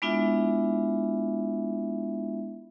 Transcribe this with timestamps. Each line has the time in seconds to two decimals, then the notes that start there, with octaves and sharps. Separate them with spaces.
0.02 G#3 B3 D4 E4 F4 E5